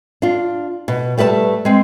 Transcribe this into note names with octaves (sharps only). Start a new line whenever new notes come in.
D4 F4
B2
G3 A3 B4 D5 A5
G#3 C4